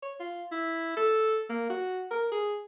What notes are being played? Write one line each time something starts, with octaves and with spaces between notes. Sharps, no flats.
C#5
F4
E4
A4
A#3
F#4
A#4
G#4